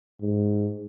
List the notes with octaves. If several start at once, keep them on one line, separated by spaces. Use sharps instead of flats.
G#2